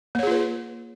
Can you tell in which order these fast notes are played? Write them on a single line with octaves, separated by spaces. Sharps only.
A#3 C#5 G#4 F4 B4